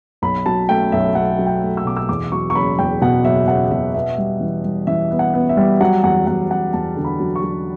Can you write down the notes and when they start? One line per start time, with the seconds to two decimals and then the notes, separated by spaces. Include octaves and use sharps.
0.22 B1 B5
0.46 F#3 A5
0.69 A3 G5
0.92 B1 E5
1.15 B1 F#5
1.39 F#3
1.46 G5
1.62 A3
1.77 E6
1.85 B2 D6
1.97 E6
2.09 E2 D6
2.32 F#3 C#6
2.50 C#6
2.55 F#1 B5
2.79 E2 G5
3.01 B2 F#5
3.25 F#1 E5
3.48 F#1 F#5
3.71 B2 E5
3.94 B3 E5
4.18 G3
4.41 E3
4.65 G3
4.87 E3 E5
5.11 B3
5.19 F#5
5.34 B3
5.49 E5
5.57 G3
5.81 F#3 F#5
6.04 E2 F#5
6.27 E2 F#5
6.51 F#3 F#5
6.73 E2 A5
6.97 D3
7.04 B5
7.20 F#3
7.36 C#6
7.43 F#3